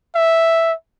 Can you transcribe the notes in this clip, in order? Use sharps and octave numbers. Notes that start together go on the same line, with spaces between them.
E5